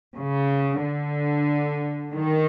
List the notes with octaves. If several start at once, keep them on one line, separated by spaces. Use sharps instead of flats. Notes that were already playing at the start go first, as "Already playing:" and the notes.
C#3
D3
D#3